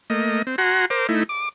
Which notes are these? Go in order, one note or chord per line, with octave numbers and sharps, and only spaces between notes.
A3 A#3 D#5
C4
F#4 F#5 G#5 A#5 C6
A#4 C5 D6
A3 D#4 E4
D6